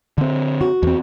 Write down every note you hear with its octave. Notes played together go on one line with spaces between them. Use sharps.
D3 C4
F#4
E2 C4